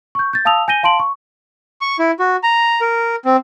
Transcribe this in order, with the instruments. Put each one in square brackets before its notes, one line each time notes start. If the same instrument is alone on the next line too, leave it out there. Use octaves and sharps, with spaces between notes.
[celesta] C#6 G6
G6 A6
F5 A5 D#6 E6 F7
G#5 G6 A#6 D#7 G7
F5 A5 C6 D7 F#7
C#6
[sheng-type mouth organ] C#6
E4
F#4
A#5
A#4
C4